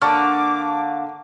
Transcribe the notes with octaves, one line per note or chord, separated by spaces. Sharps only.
D3 A#3 A5 C#6 D6 F6